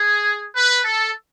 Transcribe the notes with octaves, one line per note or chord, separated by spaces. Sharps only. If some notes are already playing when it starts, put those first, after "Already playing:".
Already playing: G#4
B4
A4